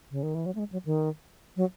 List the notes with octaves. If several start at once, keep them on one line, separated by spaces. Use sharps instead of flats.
C#3
D#3
E3
F#3
A3
G#3
F#3
D#3
F#3